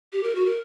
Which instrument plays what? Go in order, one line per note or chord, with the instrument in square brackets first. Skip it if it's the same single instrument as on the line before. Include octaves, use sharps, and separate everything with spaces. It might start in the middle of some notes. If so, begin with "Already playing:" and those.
[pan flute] G4
A#4
F#4
A#4